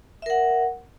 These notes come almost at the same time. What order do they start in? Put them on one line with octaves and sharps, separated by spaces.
E5 A#4 F#5